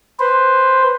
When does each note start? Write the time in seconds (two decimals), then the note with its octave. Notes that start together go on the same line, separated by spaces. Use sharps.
0.19 B4 C5